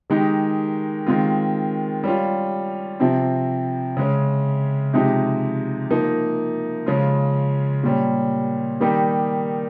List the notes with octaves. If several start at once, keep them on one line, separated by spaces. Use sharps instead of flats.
D#3 G#3 D#4 G4
D#3 G#3 C4 F4
G3 C#4 F4
C3 F3 C4
C#3 G#3 C#4
C3 F3 G#3 D#4 G4
F3 A#3 D#4
C#3 F3 G#3 C#4 F4
A#2 G3 C#4
D#3 G3 A#3 D#4 G4